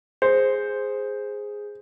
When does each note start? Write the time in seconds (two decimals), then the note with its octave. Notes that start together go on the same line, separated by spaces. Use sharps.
0.22 G#4 C5